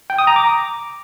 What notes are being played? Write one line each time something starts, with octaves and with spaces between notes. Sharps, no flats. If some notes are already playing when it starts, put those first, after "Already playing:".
G5
D#6
A#5
D6